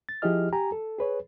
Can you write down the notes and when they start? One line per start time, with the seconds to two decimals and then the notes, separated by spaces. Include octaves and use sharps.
0.09 A6
0.22 F3 E4 G4 G#4 D#5 F6
0.53 G4 G#5 A#5
0.72 A4
0.99 G#4 B4 C#5